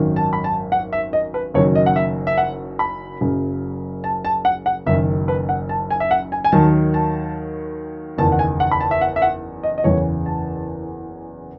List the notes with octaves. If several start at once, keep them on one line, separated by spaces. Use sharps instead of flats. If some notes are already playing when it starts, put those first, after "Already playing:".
Already playing: G#1 F#2 D#3 F#3
A5
B5
A5
F#5
E5
D#5
B4
F#1 F#2 D#3 F#3 C#5
D#5
F#5
E5
E5
F#5
B5
F#1 F#2 C#3 F#3
A5
A5
F#5
F#5
F#1 F#2 D#3 E5
B4
F#5
A5
G#5
E5
F#5
G#5
G#5
D#2 D#3 F#3 A5
A5
F#1 E2 D#3 A5
F#5
G#5
F#5
B5
A5
E5
F#5
E5
F#5
D#5
D#5
F#1 E2 C#3 E3 C#5
A5